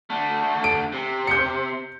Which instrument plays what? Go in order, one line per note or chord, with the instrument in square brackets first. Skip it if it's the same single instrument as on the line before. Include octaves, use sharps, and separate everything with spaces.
[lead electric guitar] D3 A3
[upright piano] D7
[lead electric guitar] C3
[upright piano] G6 C#7